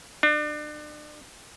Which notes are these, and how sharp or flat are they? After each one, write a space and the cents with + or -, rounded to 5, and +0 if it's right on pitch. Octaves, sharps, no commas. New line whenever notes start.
D4 +35